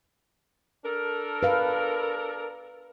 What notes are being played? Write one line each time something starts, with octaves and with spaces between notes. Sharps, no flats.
D4 A4 A#4
B4 F5